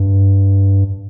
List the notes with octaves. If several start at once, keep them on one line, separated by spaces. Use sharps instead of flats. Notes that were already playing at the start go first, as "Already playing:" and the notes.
Already playing: G2